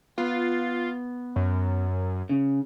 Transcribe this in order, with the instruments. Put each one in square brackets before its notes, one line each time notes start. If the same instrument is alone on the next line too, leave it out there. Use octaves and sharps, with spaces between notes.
[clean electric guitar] B3 [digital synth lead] F4
[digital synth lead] F#2
[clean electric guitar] C#3